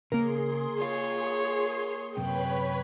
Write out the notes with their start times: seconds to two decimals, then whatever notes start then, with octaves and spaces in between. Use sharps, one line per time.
0.12 C#3 A#3 C#4 G#4 A#4 C6
0.82 F4 C#5
2.17 F#2 C3 B4 C#5 G5 B5